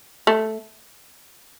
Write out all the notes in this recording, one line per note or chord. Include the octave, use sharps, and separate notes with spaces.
A3